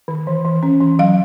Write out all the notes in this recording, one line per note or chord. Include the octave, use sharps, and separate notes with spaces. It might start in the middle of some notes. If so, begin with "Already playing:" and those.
D#3
E3
E3
C#4
E3
F#3 F5